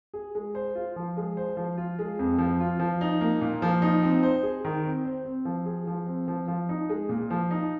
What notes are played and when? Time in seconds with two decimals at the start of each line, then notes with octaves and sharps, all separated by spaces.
0.13 G#4
0.35 G#3
0.55 C5
0.75 F4
0.96 F3
1.17 G#3
1.37 C5
1.57 F3
1.78 F4
1.99 G#3
2.19 F2
2.38 F3
2.60 F4
2.80 F3
3.01 D#4
3.21 A#3
3.41 A#2
3.62 F3
3.82 D#4
4.02 C4
4.23 C5
4.43 G#4
4.65 D#3
4.84 C4
5.05 C5
5.25 C4
5.45 F3
5.66 G#4
5.87 F3
6.07 C4
6.28 F3
6.48 F3
6.69 D#4
6.90 G#3
7.09 A#2
7.30 F3
7.51 D#4